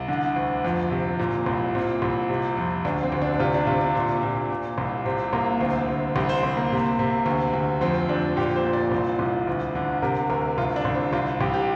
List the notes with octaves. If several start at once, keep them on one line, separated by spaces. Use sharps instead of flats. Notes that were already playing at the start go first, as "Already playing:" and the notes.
Already playing: C2
D3
D2
F2
C3
A#2
C2
A#2 C4
C2
C3
F2
D2 D4
C4
D2
D4
D4
C3 F4
D4
C3 F4
D4
A#2
A#2
A#2
C2
C3 C4
C2 A#3
D2 C4
D2
C2 G4
C5
C2 C4
A#3
C3
C3
D2
D2
F2 C4
F2 D4
A#2 G4
C5
A#2
D5
C2
C2
D2
D3
C3 A#4
D2 A#4
C2 F4
D4
C2
C4
C2 F4
C2 G4
G4